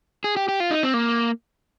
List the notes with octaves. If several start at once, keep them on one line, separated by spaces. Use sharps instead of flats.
G#4
G4
G4
F4
D#4
C4
A#3